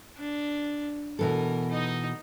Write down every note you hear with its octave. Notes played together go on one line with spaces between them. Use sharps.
D4
B2 E3 A4 A#4
D#4 D#5